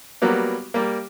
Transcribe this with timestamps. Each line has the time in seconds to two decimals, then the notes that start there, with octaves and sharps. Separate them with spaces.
0.22 F#3 G3 A#3 B3
0.74 G3 A#3